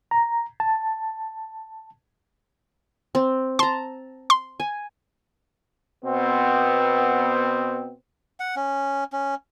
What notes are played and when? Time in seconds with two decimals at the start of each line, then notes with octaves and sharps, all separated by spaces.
0.11 A#5
0.60 A5
3.15 C4
3.59 A5 A#5 C6
4.30 C6
4.60 G#5
6.03 B2 B3 C4
8.40 F#5
8.56 C#4
9.13 C#4